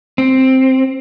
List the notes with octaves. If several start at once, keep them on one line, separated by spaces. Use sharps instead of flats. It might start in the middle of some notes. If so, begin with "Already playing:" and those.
C4